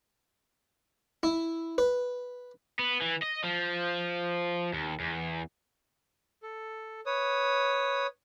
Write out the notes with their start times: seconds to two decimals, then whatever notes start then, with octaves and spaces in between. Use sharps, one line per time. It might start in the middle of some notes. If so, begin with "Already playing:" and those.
1.23 E4
1.78 B4
2.79 B3
3.01 E3
3.22 D#5
3.44 F3
4.74 D#2
5.00 E2
6.43 A4
7.06 B4 C#5 D#6